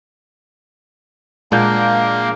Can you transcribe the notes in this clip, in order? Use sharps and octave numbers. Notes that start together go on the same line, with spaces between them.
A#2 F#3 G#3 A#3 D4 F5 F#5 G6